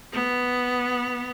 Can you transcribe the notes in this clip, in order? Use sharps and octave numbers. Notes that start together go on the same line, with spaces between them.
B3